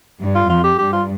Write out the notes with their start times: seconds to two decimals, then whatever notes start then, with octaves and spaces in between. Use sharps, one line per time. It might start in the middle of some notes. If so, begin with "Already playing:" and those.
0.21 G2
0.35 F4
0.50 F2 F4
0.64 G4
0.79 G2 G4
0.93 F4